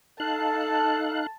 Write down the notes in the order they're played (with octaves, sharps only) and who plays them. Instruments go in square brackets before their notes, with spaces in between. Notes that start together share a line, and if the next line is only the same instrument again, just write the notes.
[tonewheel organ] D#4 F5 F#6 [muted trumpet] A4 [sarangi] A5